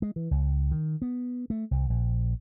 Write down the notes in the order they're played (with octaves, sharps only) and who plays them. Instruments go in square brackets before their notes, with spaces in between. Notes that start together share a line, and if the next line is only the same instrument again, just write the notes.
[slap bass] G#3
E3
C#2
D#3
B3
A3
C2
A#1